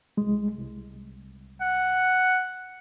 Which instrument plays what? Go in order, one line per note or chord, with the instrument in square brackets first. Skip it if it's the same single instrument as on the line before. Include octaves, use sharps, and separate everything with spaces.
[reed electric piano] C2 G#3
C2
[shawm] F#5